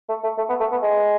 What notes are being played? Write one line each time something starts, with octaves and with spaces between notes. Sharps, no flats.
A3
A3
A3
B3
A3
B3
G#3